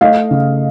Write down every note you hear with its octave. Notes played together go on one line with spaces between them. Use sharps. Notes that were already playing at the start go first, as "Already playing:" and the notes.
A3 D#5 F5
C#3